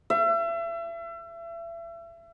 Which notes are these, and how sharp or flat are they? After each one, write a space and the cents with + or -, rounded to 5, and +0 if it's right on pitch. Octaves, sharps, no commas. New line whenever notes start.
E5 +35